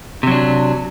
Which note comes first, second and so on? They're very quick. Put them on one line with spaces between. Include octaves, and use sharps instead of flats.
C3 F#3 D4